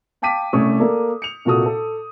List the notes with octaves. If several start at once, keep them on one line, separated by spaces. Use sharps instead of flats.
F5 G5 A5 D6 B6 D#7
C2 A3 C#4 D#6
A#3 A4 D5
C#7 F7
C2 A#2 F#4 A4 D#6
A4